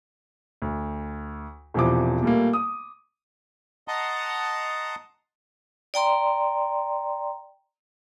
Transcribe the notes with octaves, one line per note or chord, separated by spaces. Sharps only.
D2
E1 C3 E3 F3 D6
A#2 G3 A3 A#3
D#6
D#5 F#5 A5 A#5 C6 D#6
D5 G5 A#5 C6